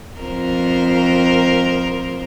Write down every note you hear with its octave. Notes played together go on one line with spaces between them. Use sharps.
F2 A#4 C5